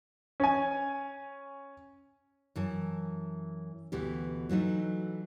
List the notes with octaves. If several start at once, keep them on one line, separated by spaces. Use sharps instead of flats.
C#4 G#5
F#2 E3 A5
D2 B2 E3 G4
E3 F#3 A3 D#4